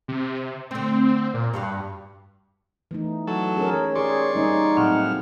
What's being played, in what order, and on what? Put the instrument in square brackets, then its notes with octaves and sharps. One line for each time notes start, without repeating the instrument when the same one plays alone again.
[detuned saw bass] C3
[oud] D3 A3 [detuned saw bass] C4
[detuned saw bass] A#2
[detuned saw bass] G2 [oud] F#4 G4 F5
[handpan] E3 A3 D#4
[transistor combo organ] F#3 A4
[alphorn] C#4 [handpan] G#4 A#4
[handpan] G4 G#4 [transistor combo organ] D5 C6 C#6
[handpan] G3 A#3 C#4 [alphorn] D#4
[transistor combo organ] A2 F6 [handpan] F#3 C4 F#5